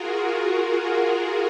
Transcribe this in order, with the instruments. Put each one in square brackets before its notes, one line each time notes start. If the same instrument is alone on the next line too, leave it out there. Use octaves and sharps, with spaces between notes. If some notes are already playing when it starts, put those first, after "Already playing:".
Already playing: [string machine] F4 F#4 G#4 A#4